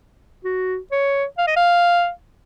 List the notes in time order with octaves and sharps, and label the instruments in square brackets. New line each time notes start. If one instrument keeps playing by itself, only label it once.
[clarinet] F#4
C#5
F5
D#5
F5